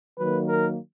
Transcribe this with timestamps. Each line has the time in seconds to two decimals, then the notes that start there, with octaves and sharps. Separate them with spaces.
0.18 D#3 F#3 A#3 B4
0.48 A#4